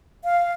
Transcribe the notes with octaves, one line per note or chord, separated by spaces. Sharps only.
F5